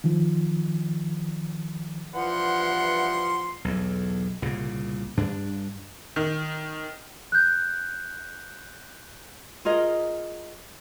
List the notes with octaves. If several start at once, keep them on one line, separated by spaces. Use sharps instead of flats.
D#3 F3
G2 E3 F3 F#5 C6
B1 E2
C2 A#2 C#3
G2 D4
D#3
F#6 G6
F4 G#4 A#4 D#5